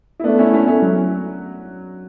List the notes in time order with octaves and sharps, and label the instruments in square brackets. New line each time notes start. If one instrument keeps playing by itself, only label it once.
[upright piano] E4
[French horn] A3 [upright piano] B3 D4
[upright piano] C#4 E4
C#4 E4
C#4 E4
F#3